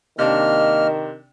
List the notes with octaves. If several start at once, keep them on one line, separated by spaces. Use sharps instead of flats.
C3 D#3 A#3 D4 D#5 F6